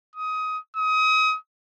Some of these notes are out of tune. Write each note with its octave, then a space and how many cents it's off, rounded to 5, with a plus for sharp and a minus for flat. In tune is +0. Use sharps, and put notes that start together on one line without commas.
D#6 +20
D#6 +30